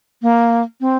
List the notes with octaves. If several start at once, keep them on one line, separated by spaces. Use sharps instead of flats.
A#3
C4